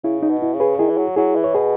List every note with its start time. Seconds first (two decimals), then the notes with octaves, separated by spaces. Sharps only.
0.04 C#3 E4
0.23 D#4
0.29 B2
0.42 E4
0.54 C#3
0.60 G#4 B4
0.79 D#3 E4 G#4
0.90 E3
0.98 F#3
1.16 F#3 E4 G#4
1.36 E3
1.44 C#5
1.54 B2 G#4 B4